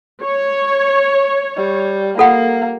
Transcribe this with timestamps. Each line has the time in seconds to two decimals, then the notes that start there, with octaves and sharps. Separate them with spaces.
0.24 C#5
1.57 G3
2.18 A#3 F4 A4 F#5